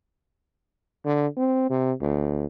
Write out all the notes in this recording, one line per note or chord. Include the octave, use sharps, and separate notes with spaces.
D3
C4
C3
D2